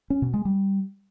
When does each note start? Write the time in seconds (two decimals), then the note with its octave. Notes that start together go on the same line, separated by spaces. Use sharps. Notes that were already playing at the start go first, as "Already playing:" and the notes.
0.10 C#4
0.22 B2
0.34 G#3
0.45 G3